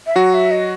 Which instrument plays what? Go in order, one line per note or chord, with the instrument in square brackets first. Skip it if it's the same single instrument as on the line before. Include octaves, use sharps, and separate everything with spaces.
[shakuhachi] E5
[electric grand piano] F#3 F#4 [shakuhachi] F#5
[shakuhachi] E5
D#5